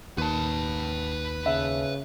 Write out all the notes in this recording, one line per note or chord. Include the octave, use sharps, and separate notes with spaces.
D#2 B4 A5
C#3 E5